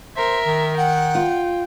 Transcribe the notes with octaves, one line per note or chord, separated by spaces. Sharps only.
A#4 C5 E5
D#3
F#5 G5
F4